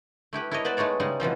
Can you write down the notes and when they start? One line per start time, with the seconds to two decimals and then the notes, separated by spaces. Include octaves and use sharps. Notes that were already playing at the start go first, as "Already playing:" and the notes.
0.33 A3 E4 G4 B4
0.51 E4 A4 A#4 C#5 D#5
0.65 B3 B4 C5 D5
0.77 G#3 A3 D#4 C#5 D5
1.00 C#3 G3 G#3 D#4
1.20 B2 E3 F3 C4